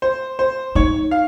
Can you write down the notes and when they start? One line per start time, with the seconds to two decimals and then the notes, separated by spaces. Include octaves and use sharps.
0.02 C5
0.39 C5
0.75 D#4 C#5
1.11 F5